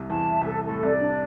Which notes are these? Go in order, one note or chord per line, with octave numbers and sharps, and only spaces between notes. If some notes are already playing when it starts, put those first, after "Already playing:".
Already playing: C2 C3
E2 E3 A5
E5
C2 C3 A4
A2 A4
C2 C3 D5
D4